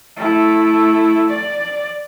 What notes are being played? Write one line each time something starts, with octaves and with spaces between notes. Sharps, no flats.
A3 E4
D5